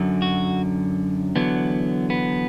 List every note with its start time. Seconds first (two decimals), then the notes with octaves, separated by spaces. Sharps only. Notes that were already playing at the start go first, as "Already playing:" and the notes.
Already playing: F#2 D3 F#3
0.22 F#4
1.36 E2 D3 F#3 B3
2.10 B3